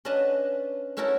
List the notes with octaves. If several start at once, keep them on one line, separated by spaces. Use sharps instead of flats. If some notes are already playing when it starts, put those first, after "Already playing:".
C#4 D4 B4 D#5 F#5 A5
A3 C#4 E4 F#4 A4 A#4